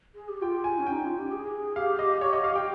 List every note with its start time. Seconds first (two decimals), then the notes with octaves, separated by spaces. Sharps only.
0.15 G#4
0.29 G4
0.42 F4 G5
0.64 G#5
0.78 C#4
0.87 D#4 G5
1.05 F4
1.18 G4
1.32 G#4
1.76 G4 F5
1.99 D#5
2.21 C#5
2.33 D#5
2.44 F5
2.56 G5